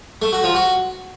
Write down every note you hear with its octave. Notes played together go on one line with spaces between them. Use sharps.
A3
F#4
F3
F#4